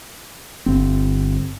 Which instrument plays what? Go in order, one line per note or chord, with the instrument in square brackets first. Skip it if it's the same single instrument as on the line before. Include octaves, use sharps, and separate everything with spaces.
[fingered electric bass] G1 C4